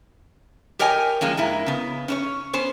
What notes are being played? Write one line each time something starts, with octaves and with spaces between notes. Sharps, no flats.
G4 A#4 C#5 D#5 G5 G#5
F3 G#3 A#3 C#4
G#2 A#3 E4
C#3 B3
C#4 D4 C#5
B3 C#4 C5